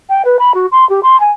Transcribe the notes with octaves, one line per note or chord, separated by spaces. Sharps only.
G5
B4
B5
F#4
C6
G4
C6
G#5